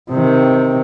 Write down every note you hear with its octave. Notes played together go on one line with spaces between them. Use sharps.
C3 D#3